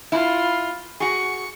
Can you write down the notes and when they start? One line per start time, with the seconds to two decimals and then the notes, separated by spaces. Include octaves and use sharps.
0.12 E4 F4
1.00 F#4 G#4 C#6